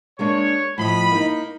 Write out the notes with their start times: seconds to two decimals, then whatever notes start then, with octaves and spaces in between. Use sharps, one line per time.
0.19 G#3 A#3 D4 C#5
0.78 A2 F3 D#5 B5
1.11 A#3 D#4